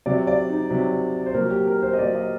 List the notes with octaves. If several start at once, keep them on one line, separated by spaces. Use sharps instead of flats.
C3 F#3 D5
D5
D#4
C3 F#3
C5
A#2 F#3 A#4
G4
A#4
C5
D#5
A#2 F#3 D5
D#5